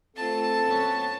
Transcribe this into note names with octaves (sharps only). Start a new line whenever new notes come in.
A3 C4 F4 A4 A5
F#2 B3 C#5